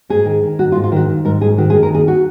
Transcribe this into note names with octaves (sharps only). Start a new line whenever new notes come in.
G#2 G#4
D#3
D#3
G#2 F#4
F4
G#2
F4
D#3 F#4
D#3
G#2 A#4
G#2 G#4
D#3 F#4
G#4
D#3
A#4
D#2 G#4
F#4